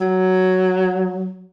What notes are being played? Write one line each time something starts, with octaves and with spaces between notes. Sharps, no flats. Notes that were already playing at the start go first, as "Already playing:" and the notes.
F#3